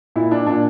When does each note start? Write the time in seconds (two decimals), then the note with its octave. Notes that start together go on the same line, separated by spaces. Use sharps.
0.16 A#2 E4
0.31 D4
0.47 A#2 D4